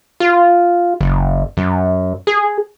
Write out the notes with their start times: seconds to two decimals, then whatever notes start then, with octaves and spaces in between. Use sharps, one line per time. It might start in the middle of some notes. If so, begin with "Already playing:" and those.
0.20 F4
1.01 F#1
1.57 F#2
2.27 G#4